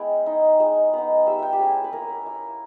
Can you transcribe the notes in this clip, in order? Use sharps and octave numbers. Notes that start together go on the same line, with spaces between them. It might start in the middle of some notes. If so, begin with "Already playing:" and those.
Already playing: G#3 B3 E4 G5
D#4
G#3
B3 D#4
G3 E5
E5 G5
G4
C#4 E4 G#4
B4
A#3 A#4
E4